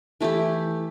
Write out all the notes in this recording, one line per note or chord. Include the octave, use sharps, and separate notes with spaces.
E3 A3 E4 G4